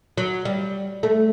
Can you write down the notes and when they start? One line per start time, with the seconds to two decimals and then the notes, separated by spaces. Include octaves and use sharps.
0.18 F#3
0.45 G3
1.03 A3